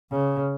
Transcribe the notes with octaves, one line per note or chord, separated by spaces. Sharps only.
C#3